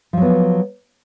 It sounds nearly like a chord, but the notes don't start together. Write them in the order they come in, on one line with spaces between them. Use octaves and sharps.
F3 F#3 B3